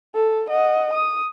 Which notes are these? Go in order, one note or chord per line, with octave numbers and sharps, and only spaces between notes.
A4
D#5 F#5
D#6